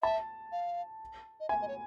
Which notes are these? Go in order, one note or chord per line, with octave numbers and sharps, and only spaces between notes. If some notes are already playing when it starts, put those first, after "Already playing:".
E5 A5
F5
D#5
E5 G#5
D#5
C#5